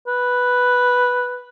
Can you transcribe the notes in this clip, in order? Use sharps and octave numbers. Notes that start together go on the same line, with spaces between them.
B4